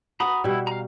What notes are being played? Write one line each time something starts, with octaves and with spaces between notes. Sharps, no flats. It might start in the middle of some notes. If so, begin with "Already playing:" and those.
F#4 B4 A#5 B5 D#6
B2 G3 E4
F5 A#5